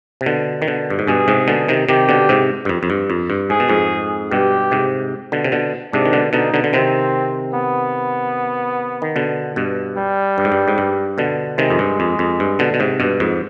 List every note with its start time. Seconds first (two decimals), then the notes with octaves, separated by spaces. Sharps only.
0.21 C3
0.26 B2 D3
0.62 D#3
0.68 B2 D3
0.90 G2
0.99 G#2
1.07 G2 B2 G#4
1.28 G#2 C3
1.48 B2 D3
1.69 C3 D#3
1.89 C3 D#3 G4
2.09 B2 D3
2.29 G#2 C3
2.65 G2
2.69 F2
2.83 F2
2.90 G2
3.10 F2
3.30 G2
3.50 G#2 G#4
3.60 B2
3.69 F2 G#2
4.31 G2 B2 G4
4.71 G#2 C3
5.32 B2 D3
5.44 C3
5.52 B2 D3
5.93 G#2 C3 D4
6.06 D#3
6.13 B2 D3
6.33 B2 D3 D#4
6.54 B2 D3
6.64 D3
6.73 C3 D#3 C4
7.54 B3
9.02 D#3
9.16 B2 D3
9.56 G2 B2
9.97 G3
10.38 G2
10.45 G#2
10.52 G2
10.68 G#2
10.78 G2
11.18 B2 D3
11.58 C3 D#3 G#3
11.70 F2
11.79 G2
12.00 F2
12.19 F2
12.40 G2
12.59 B2 D3
12.74 B2
12.80 G#2 C3
13.00 G2 B2
13.20 F2 G#2